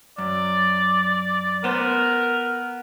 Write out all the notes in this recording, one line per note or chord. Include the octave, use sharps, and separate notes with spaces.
F#2 D5
B3 A#4 C5